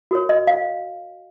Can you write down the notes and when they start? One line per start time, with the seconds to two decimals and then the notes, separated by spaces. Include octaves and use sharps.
0.11 F#4 A#4 C#5
0.29 D#5
0.47 F5